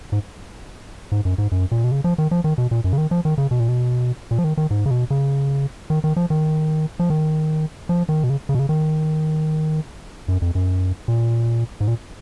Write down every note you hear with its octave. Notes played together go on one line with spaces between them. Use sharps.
G#2
G#2
F#2
G#2
F#2
A#2
B2
C#3
F3
D#3
F3
D#3
B2
A#2
F#2
C#3
D#3
F3
D#3
C#3
B2
A#2
B2
A#2
F3
D#3
D#3
G#2
C#3
B2
C#3
D#3
D#3
F3
D#3
F3
D#3
F3
D#3
B2
C#3
C#3
B2
C#3
D#3
F#2
F2
F#2
A#2
G#2
A#2